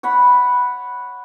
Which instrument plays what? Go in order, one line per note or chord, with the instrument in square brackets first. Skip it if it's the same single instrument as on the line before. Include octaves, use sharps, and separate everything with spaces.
[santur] C#5 F#5 B5